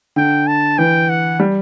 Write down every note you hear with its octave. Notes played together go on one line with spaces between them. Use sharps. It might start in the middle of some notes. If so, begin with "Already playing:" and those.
D3 G5
A5
E3 G5
F#5
G3